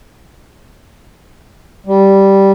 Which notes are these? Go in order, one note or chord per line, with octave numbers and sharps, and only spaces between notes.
G3